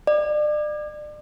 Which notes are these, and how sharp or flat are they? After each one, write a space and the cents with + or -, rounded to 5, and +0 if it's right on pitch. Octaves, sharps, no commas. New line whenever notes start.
D5 +35